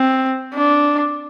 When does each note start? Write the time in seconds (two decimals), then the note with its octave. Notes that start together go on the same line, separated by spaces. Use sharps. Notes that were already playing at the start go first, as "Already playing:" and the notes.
Already playing: C4
0.55 D4